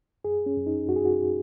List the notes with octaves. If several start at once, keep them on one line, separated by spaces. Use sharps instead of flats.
F#2 G#4
C#4
F#2
D#4
F#2 F#4
G#4
F#4